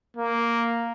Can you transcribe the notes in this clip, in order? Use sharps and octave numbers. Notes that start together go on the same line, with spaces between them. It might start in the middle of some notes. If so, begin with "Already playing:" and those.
A#3